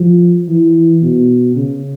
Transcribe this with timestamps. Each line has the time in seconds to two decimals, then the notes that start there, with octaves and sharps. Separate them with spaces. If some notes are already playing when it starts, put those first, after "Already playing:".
Already playing: F3
0.49 E3
1.02 B2
1.56 C#3